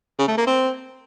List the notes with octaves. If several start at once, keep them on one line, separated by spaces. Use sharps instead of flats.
C#3
A3
A#3
C4